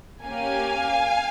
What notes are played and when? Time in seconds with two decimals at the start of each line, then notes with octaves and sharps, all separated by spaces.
0.24 A#3 C#4 G4 F5 G#5